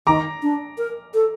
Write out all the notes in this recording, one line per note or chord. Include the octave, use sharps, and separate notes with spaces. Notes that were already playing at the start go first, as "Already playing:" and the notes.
D#3 A#5 D6
D4
A#4
A4